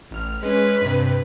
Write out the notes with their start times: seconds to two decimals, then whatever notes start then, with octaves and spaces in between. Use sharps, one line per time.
0.11 A1 F6
0.43 G#3 C#4 B4
0.82 G2 C3